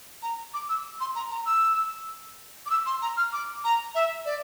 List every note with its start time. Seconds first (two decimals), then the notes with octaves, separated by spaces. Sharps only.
0.22 A#5
0.54 D6
0.69 E6
1.00 C6
1.15 A#5
1.31 A#5
1.46 E6
2.66 D6
2.70 E6
2.86 C6
3.02 A#5
3.17 F6
3.33 D6
3.64 A#5
3.95 E5
4.25 D5